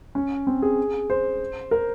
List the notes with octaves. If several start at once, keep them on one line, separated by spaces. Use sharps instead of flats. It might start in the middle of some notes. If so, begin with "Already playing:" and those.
C#4
C4
G#4
C5
A#4